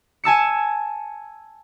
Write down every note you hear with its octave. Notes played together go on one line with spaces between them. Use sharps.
G#5 A5 E6 C#7